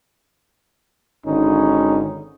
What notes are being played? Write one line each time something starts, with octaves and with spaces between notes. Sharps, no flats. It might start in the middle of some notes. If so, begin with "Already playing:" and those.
G#1 D3 C#4 D#4